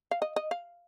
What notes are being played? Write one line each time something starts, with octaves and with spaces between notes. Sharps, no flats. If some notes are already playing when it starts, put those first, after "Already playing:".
F5
D#5
D#5
F5